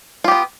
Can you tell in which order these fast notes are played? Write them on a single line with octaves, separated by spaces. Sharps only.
F4 G4 B3